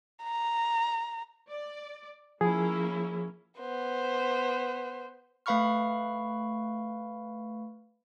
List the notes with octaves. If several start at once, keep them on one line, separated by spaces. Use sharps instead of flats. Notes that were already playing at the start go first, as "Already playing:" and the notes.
A#5
D5
F3 A#3 C#4 E4 G#4
B3 C5
A3 B4 F5 B5 C#6 F6